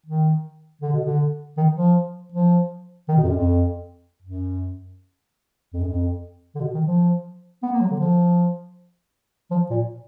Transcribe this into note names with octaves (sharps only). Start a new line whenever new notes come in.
D#3
D3
B2
D3
D#3
F3
F3
D#3
B2
F2
F#2
F2
F#2
F2
F#2
F2
D3
B2
D#3
F3
B3
A#3
F#3
D3
F3
F3
A#2